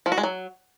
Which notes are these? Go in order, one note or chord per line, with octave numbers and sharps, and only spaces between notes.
F3
F#4
G#3
F#3